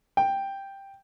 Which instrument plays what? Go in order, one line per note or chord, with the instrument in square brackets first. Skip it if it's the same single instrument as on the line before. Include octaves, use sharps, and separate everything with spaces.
[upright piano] G5